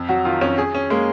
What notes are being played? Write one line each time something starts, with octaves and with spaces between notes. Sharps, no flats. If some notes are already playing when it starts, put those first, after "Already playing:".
Already playing: F2
F#3 F#4
D#3 F4
F2 C#4
G#4
C#4
G#3 A#3